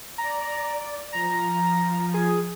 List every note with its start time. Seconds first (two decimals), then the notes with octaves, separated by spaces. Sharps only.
0.18 D5 A#5
1.13 F3 A#5
2.14 G#4